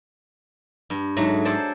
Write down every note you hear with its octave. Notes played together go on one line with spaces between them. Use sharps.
G2
G#2 F#3 A3
G#4 A4 C5 D5 A5